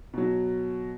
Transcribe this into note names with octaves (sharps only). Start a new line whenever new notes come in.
B2 F#3